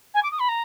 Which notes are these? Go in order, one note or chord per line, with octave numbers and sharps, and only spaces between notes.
G#5
D6
D#6
B5
A#5